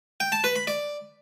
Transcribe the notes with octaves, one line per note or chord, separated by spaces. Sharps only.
G5
A5
B4
B5
D5